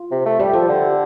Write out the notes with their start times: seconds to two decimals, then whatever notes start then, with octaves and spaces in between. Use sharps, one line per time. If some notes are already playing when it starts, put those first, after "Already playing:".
Already playing: F4
0.11 C3
0.26 A3
0.40 G3 G4
0.53 F3 A4
0.69 D3